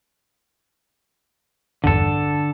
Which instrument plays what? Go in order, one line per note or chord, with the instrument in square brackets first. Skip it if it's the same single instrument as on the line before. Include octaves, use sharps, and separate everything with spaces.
[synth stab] A#1 E2 G2 [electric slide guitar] D3 A4